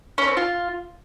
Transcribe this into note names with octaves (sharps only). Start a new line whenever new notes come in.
C#4
C4
F4